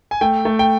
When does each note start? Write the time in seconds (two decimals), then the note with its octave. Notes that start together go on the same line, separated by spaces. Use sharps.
0.11 G#5
0.21 A3 G5
0.45 A3
0.59 G5